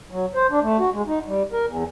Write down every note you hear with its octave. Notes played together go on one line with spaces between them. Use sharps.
F#3
C5
D4
A3
F#4
G#3
D#4
G3
A#4
E2